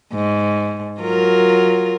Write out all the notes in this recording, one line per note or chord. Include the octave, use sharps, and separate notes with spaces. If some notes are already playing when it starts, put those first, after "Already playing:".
G#2
F#3 F4 A#4